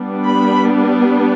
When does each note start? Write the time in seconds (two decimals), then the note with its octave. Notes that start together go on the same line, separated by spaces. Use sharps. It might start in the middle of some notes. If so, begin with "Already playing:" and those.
Already playing: G3 B3 D4
0.27 B5